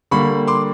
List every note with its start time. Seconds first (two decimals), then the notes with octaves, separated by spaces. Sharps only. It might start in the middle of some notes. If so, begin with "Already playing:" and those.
0.11 D3 G3 A#3 B5 C#6
0.47 C6 D6